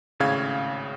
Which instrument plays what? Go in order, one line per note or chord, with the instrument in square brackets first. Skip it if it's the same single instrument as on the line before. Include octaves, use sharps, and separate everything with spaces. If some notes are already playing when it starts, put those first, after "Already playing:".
[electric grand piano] G#1 A2 C#3 F5 G#6